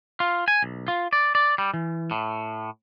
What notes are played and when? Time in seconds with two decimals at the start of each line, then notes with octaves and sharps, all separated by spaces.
0.20 F4
0.48 G#5
0.63 B1
0.88 F4
1.13 D5
1.35 D5
1.58 G3
1.74 E3
2.11 A2